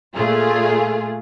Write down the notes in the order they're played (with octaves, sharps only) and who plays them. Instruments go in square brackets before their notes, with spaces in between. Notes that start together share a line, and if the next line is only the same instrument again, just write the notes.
[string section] A#2 A3 F4 G#4